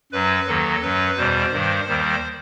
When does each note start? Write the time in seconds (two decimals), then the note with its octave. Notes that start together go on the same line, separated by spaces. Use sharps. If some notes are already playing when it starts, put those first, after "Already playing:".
0.12 F#2 F#3 B4
0.47 D#2 D#3 F#3 A4
0.82 F#2 F#3 B4
1.18 E2 B2 G3 C5
1.52 G2 D#3 G3
1.88 D#2 D#3 G3